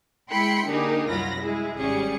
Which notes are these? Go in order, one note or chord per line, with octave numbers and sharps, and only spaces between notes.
G#3 E4 G5 B5 C6 C#7
D3 A#3 D4 D#4 G4 G#4
C2 F#2 F#3 F4 B5 A#6
G#3 E4 G#4
G#1 G3 C#4 G#4 C#7